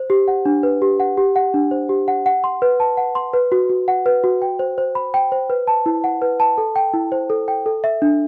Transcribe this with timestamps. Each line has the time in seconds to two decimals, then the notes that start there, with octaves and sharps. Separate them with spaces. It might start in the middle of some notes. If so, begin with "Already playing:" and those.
Already playing: C5
0.10 G4
0.28 F#5
0.45 D4
0.63 B4
0.82 G4
1.00 F#5
1.17 G4
1.36 F#5
1.54 D4
1.71 C5
1.89 G4
2.08 F#5
2.26 F#5
2.44 C6
2.62 B4
2.80 A5
2.97 F#5
3.15 C6
3.33 B4
3.52 F#4
3.69 F#4
3.88 F#5
4.06 B4
4.24 F#4
4.42 G5
4.59 C5
4.78 C5
4.95 B5
5.14 G5
5.32 C5
5.50 B4
5.67 A5
5.86 E4
6.04 F#5
6.22 B4
6.40 A5
6.58 A4
6.76 G5
6.94 E4
7.12 C5
7.30 A4
7.48 G5
7.66 A4
7.84 E5
8.02 D4